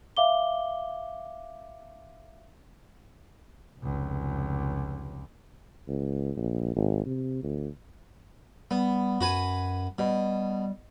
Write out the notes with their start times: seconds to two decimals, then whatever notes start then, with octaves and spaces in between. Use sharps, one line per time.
0.17 E5 F5 D6 G7
3.80 F1 C#2
5.88 C#2
6.37 A#1
6.76 G#1
7.06 C3
7.43 D2
8.71 G3 B3
9.21 F#2 F#4 B4 G#5
9.98 B2 G3